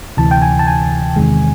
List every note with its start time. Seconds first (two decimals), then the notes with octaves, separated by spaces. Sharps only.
0.17 D2 C3 E3 A5
0.31 G5
0.42 G#5
0.59 A5
0.67 G#5
1.16 E2 C3 D#3 G#3